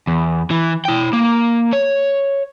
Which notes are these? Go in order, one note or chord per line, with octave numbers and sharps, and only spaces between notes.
E2
E3
E4 G5
A#3
C#5